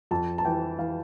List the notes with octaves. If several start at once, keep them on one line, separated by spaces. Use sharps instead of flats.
F2 A5
A5
E3 G5
E3 F5